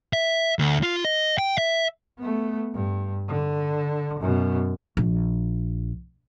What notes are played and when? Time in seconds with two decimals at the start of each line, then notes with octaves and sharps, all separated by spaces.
0.13 E5
0.59 D2
0.83 F4
1.04 D#5
1.38 G5
1.58 E5
2.19 A3 B3
2.74 G2
3.29 D3
4.20 F#2 B2
4.97 A#1